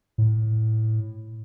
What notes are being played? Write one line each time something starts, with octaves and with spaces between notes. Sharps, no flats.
A2